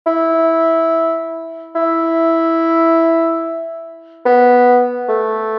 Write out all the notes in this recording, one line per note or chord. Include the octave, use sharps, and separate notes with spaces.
E4
E4
B3
A3